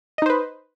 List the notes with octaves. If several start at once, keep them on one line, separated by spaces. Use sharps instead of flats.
D#4 B4 C5 D#5